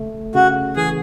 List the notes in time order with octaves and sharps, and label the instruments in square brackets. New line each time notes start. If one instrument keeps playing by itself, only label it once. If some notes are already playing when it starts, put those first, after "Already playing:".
Already playing: [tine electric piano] C#3 A3
[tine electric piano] C#3 [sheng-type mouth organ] F#4
[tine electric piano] E3 [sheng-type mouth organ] G#4